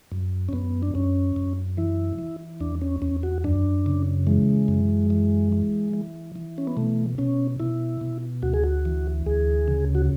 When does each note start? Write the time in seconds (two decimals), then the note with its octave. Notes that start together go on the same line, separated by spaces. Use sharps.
0.12 F#2
0.49 C#4
0.53 F#2 B3
0.83 D4
0.95 F#2 C#4
1.36 F#2
1.77 E3 E4
2.19 E3
2.60 E2 D4
2.82 C#4
3.02 E2 C#4
3.23 F#4
3.44 F#2 D4
3.86 C#3
4.27 E3 G#3
4.68 F#2
5.10 E3
5.52 E3
5.93 E3
6.36 E3
6.58 C#4
6.67 B3
6.77 B2 A3
7.18 B2 C#4
7.60 B2 E4
8.01 B2
8.43 D2 F#4
8.54 G#4
8.63 F#4
8.85 E3
9.26 D2 G#4
9.68 C#3
9.95 F#4